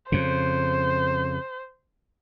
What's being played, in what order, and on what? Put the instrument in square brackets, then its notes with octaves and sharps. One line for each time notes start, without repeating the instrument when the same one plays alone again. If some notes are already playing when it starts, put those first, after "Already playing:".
[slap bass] F2 C#3 [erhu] C5